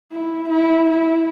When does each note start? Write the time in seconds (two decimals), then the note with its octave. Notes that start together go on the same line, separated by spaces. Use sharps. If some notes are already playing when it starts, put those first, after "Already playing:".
0.12 E4
0.50 E4
0.90 E4